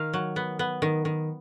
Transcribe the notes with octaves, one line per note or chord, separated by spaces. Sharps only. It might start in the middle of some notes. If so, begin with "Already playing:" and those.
Already playing: D#3 F5
F#3
B3
B3
D#3
D#3